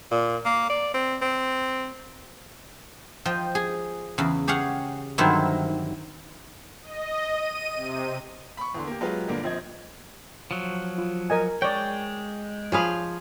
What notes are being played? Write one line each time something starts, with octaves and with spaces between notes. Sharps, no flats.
A#2
A#3
D5
C4
C4
F3 D#5 G5
G#4
E2 C#3
G4 G#4 C#5 F5 F#5
G2 D3 D#3 F#3 C4 E4
D#5
D#7
C3
B5 C#6
E2 D3 C6
A#3 G4
F#3 G#3 F4 G4 B4
G2 A#2 D3 A#3 D4
A#1 F3 C4 D#5 G#6
F3 F#3
F4
A#4 D#5 G#5
G#3 C#5 D5 G5
F3 G#4 C#5 F5 G#5 B5